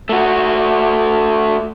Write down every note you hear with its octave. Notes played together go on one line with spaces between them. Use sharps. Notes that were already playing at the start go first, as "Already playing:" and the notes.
A3 F#4